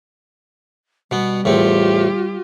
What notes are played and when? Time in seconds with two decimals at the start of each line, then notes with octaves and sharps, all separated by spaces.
1.11 B2 G3 B3
1.45 E2 A2 C4 F4 G4